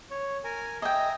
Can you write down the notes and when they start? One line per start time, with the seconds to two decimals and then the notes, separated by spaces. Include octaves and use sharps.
0.11 C#5
0.44 A#4 G#5
0.82 D#5 E5 G5 G#5 A#5